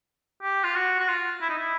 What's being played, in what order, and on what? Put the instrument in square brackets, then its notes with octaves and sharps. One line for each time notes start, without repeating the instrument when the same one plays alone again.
[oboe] G4
F4
F#4
F#4
F4
E4
D#4
E4